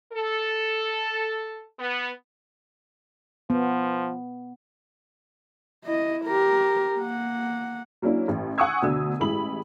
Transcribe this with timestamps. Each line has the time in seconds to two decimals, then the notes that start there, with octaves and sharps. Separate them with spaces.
0.12 A4
1.79 B3
3.50 F3 B3
5.85 E4 D#5
6.25 G4 A#4
6.99 A#3 F#5
8.02 F#3 A#3 C#4 D4 E4
8.28 A1
8.58 F#5 G#5 C#6 D#6 E6 G#6
8.82 D2 B2 D3 E6
9.20 A1 G#3 E4 B5 F#7